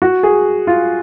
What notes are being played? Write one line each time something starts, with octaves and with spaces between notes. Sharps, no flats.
F#4
G#4
F4